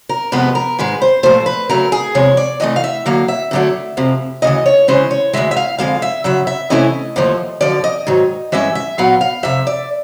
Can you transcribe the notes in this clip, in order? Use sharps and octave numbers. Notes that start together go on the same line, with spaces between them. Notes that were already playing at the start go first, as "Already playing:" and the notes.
A#4
F2 C3 F3 G#3 B3 B4
A#4
G#2 D#3 G#3 B4
C5
A#2 F3 A3 C5
B4
C#3 F#3 A3 A#4
G#4
E2 C3 F3 G#3 C#5
D5
C3 E3 A3 D#5
F5
E5
D3 F#3 A#3 F5
E5
F#2 D3 F#3 A3 D4
F2 C3 F3
D2 C#3 E3 D#5
C#5
C#3 E3 G#3 C#4 C5
C#5
D2 C3 E3 G#3 E5
E5
F5
F2 D3 F3 G#3 F5
E5
F#2 C#3 F#3 E5
E5
C3 E3 A3 C#4 E4 D#5
D#2 D3 F3 A3
F#2 D3 F3 D5
D#5
G#2 D#3 F#3
G2 E3 G#3 C#4 E5
E5
A#2 F#3 B3 F5
F5
F2 C3 E5
D5